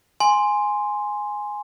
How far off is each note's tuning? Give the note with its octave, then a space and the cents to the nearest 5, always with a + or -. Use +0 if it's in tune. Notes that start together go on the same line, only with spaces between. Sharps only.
G#5 +0 C6 +0